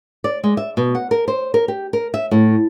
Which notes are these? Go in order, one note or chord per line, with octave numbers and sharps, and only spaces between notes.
D5
G#3
E5
B2
F#5
A#4
C5
A#4
G4
A#4
E5
A2